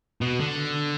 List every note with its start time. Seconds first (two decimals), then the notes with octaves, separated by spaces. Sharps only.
0.21 B2
0.40 D3